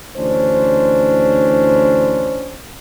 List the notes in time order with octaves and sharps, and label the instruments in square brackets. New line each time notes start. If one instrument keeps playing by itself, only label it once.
[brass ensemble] D2 E3 C#4 D4 C5